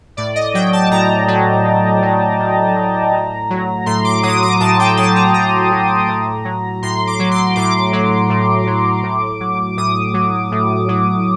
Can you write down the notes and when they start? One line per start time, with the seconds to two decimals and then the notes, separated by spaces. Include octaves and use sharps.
0.17 A2 D5
0.35 D#5
0.54 F#3 G5
0.73 A5
0.91 A2 A#5
1.28 F#3
1.65 A2
2.02 F#3
2.40 A2
2.75 F#3
3.13 A2
3.50 F#3
3.86 A2 C6
4.05 D6
4.23 F#3 D#6
4.43 D6
4.60 A2 A5
4.79 G5
4.97 F#3 A5
5.16 A#5
5.34 A2 A#5
5.72 F#3
6.09 A2
6.45 F#3
6.83 A2 C6
7.07 D6
7.19 F#3
7.31 C6
7.56 A2 D6
7.93 F#3
8.30 A2
8.67 F#3
9.04 A2
9.40 F#3
9.77 A2 D#6
10.14 F#3
10.52 A2
10.88 F#3